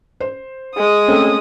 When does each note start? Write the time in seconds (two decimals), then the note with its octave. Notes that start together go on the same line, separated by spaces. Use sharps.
0.20 C5
0.76 G#3 D#6
1.08 A3 C4 C#4